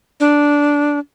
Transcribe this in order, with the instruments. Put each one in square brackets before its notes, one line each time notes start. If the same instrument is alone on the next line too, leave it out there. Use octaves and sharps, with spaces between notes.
[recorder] D4